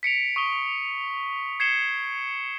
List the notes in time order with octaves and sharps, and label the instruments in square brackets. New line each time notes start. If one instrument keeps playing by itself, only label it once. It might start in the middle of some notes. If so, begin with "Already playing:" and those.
[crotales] B6 C#7 D7 F7
C#6 D#6 G7
G#6 C7 C#7 E7 G7